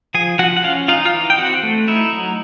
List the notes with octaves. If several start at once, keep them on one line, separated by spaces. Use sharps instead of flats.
F3 G#4 G#5
F3 F#4 F#5
F#5
C#4 F4 F5
D#4 F4 F5
F4 F5
E3
G5
C4 F#4 F#5
A3
D#4 E4 E5
F#3